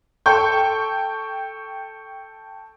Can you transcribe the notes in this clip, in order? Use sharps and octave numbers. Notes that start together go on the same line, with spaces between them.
A4 G5 C#6 G6